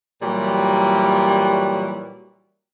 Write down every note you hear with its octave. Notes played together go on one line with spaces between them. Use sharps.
A#2 E3 F#3 G3